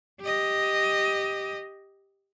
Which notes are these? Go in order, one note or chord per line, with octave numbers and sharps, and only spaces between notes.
G4 D#5